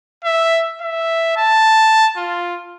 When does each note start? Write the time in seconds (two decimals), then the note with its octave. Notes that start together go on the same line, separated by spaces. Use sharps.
0.25 E5
0.81 E5
1.37 A5
2.17 F4